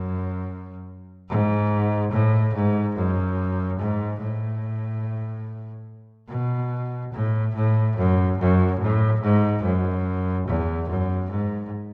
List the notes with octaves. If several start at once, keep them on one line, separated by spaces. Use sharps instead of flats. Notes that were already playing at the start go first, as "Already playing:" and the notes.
Already playing: F#2
G#2
A2
G#2
F#2
G#2
A2
B2
A2
A2
F#2
F#2
A2
G#2
F#2
E2
F#2
G#2